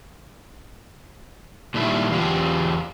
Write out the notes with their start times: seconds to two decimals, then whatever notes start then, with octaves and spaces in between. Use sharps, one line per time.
1.74 A#2 D#3 G3 E4
2.11 E2 F4 G4